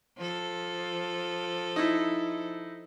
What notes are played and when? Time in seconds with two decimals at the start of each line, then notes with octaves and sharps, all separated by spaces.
0.17 F3 A4
1.76 D#4 E4